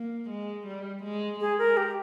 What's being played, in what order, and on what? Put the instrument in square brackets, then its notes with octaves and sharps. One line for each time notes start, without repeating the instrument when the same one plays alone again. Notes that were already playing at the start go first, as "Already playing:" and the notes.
Already playing: [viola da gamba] A#3
G#3
G3
G#3
[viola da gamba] G#3 [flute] G#4
[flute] A#4
G4